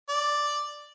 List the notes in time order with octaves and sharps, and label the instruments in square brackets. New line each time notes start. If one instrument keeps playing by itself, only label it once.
[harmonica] D5